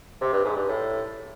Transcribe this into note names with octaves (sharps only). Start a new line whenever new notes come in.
C3
G2
G#2
G2
A2